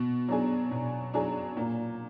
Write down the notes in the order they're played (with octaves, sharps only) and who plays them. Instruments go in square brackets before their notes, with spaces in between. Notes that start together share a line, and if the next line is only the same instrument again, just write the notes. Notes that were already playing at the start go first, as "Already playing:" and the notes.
Already playing: [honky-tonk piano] B2
F#3 D4 G#4
B2
F#3 D4 G#4
A#2